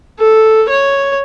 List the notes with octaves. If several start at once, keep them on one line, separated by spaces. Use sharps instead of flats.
A4
C#5